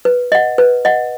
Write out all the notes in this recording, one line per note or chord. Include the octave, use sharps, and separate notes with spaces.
B4
D#5 F#5
B4
D#5 F#5